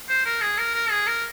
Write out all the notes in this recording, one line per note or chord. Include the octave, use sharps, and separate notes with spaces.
C5
A#4
G#4
A#4
A#4
G#4
A#4